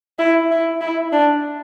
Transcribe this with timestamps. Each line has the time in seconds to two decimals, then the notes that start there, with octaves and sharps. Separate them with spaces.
0.19 E4
0.51 E4
0.81 E4
1.12 D4